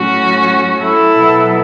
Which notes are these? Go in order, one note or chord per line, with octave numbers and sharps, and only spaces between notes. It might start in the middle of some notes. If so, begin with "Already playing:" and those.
Already playing: A2 F#3 C#4 F#4
E4 A4
B2 F#3 B3